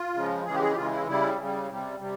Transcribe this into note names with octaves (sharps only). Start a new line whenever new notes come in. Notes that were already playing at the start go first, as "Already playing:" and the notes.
Already playing: F4
C#3 F3 G#3
C#3 E3 G#3 G#4
G4
G#4
G4
C#3 E3 G#3 F4
E4
C#3 G3 E4
C#3 G3
C3 G3
C3 G3